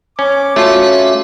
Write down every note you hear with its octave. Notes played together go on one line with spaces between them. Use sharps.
C#4 D6
A3 C#4 F4 F#4 E5